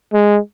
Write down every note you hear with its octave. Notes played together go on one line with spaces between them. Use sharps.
G#3